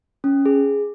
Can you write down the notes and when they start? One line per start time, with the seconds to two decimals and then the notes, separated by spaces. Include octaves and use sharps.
0.24 C#4
0.46 G#4